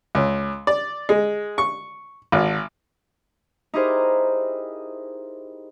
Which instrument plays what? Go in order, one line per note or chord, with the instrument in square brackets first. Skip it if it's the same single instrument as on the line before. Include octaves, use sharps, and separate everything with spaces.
[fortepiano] C#2
D5
G#3
C#6
G#1
[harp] D#4 E4 G4 G#4 A#4 C5